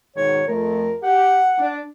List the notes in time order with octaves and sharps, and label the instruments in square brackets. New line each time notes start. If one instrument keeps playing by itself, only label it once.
[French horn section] G#2 B2 D#3 [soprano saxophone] C#5
[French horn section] F2 A3 [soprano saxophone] A#4
[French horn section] G4 [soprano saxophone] F#5
[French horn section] D4